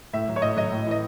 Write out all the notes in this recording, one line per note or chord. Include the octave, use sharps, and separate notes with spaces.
A2 E5
F#3
C#5
A2 D#5
F#3 D#5
A2
E3 D#5